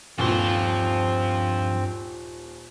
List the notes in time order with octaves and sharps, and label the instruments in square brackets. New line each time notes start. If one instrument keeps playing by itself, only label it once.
[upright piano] D#1 A#2 [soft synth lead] G2 [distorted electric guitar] F3 C6 [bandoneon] C4